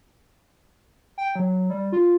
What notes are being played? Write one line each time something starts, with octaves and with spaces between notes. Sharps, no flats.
G5
F#3
G3
F4